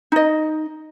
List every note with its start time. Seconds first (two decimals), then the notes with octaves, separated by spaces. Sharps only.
0.12 D#4 D#5